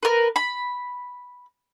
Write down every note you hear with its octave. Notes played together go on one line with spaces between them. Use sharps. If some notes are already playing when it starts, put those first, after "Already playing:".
A#4 B4
B5